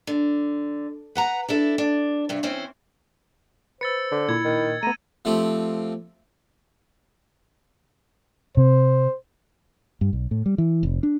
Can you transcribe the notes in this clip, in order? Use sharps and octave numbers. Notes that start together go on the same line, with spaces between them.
D3
B4 F#5 A#5
D4 E4 A4
D4
G2 C3
E3 C4 C#4 C5
B4 C5 E6 A6 C#7
D3
A#2 E4 G#6
D#3
A3 B3 A#5 D#7
F3 A3 C4 G4
C3 C5
G2
B1
A2
G3
E3
F1
D4